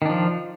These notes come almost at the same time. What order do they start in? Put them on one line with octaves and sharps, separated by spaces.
D#3 D4 F3